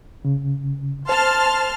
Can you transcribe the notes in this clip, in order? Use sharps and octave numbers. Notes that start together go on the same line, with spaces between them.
C#3
C5 A5 C6 F6